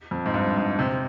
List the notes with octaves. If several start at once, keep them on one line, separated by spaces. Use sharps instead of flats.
F2
G#2
G2
G#2
C3